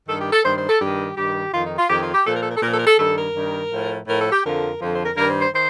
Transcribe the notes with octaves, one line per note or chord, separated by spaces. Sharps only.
G2 D#3 A4
G4
A4
G2 D#3 C5
C5
A4
G2 D#3 G4
G2 D#3 G4
F2 D#3 F4
D#4
F4
F2 D#3 G4
F4
G4
A#2 F3 A4
A#4
A4
A#4
A4
A#2 F3 A4 A#4
A#4
A4
G2 D#3 A4
A#4
G2 D#3
A2 F3
A2 F3 A#4
A4
G4
F2 D3 F3 A#4
F2 D3 F3 C5
C5
A#4
G2 D#3 A#4
C5
C5
D#3 C5